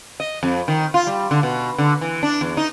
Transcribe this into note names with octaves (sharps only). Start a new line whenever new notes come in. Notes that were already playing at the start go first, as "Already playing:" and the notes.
D#5
F2
D#3
F4
G3
D3
B2
D3
E3
D4
E2
D#4